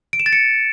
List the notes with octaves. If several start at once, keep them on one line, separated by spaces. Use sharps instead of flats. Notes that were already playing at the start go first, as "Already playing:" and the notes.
D7
E7
A6
C#7